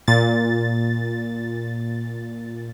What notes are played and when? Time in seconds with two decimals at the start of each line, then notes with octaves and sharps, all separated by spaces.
0.08 A#2 A6